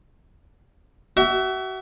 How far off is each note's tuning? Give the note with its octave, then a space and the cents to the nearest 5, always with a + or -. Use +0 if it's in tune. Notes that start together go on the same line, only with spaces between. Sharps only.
F#4 +35 E5 +0